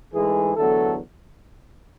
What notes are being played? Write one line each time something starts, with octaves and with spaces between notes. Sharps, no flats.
G#2 E3 G#3 A3 G#4
E2 D3 F#3 A3 B3 A4